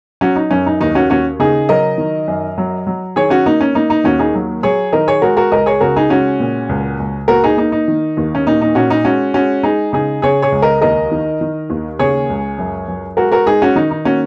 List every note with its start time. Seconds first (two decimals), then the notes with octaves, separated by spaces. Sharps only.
0.21 F#3 C#4 F#4
0.36 D#4
0.51 F#2 C#4
0.66 D#4
0.81 D#2 D#4
0.95 C#4 F#4
1.10 D#2 C#4 F#4
1.40 C#3 D#4 G#4
1.69 F#3 A#4 D#5
1.98 D#3
2.28 F#2
2.58 F#3
2.87 F#3
3.16 D#3 G#4 C#5
3.30 C#4 F#4
3.46 A#3 D#4
3.61 C#4
3.75 A#3 D#4
3.90 D#4
4.04 D#2 C#4 F#4
4.19 D#4 G#4
4.35 F#3
4.63 F#3 G#4 C#5
4.93 D#3 A#4 D#5
5.08 G#4 C#5
5.22 G#3 F#4 A#4
5.37 F#4 A#4
5.51 C#2 A#4 D#5
5.66 G#4 C#5
5.81 C#3 F#4 A#4
5.96 D#4 G#4
6.10 G#3 C#4 F#4
6.40 A#2
6.69 C#2
7.00 C#2
7.28 A#3 F#4 A#4
7.44 D#4 G#4
7.57 A#3 D#4
7.72 D#4
7.88 D#3
8.17 D#2
8.35 C#4
8.47 A#2 D#4
8.62 D#4
8.75 A#2 C#4 F#4
8.90 D#4
9.05 G#3 C#4 F#4
9.34 G#3 C#4 F#4
9.63 G#3 D#4 G#4
9.93 C#3 D#4 G#4
10.22 C#3 G#4 C#5
10.42 G#4 C#5
10.52 C#2
10.62 A#4 D#5
10.81 D#2 A#4 D#5
11.12 D#3
11.41 D#3
11.70 D#2
11.99 C#3 G#4 C#5
12.30 C#2
12.59 F#2
12.88 F#2
13.17 G#3 F#4 A#4
13.32 F#4 A#4
13.46 G#3 D#4 G#4
13.62 C#4 F#4
13.76 D#3 D#4
13.91 D#4
14.05 A#3 C#4 F#4